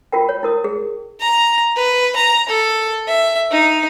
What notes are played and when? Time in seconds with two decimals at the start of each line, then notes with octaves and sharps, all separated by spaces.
0.12 F4 F#4 A#4 G5
0.29 C#5
0.43 E4 A#4 D#6
0.64 G#4
1.20 A#5
1.76 B4
2.16 A#5
2.49 A4
3.07 E5
3.51 D#4